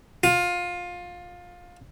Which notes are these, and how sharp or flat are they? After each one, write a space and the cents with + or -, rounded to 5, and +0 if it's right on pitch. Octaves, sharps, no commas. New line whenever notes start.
F4 +20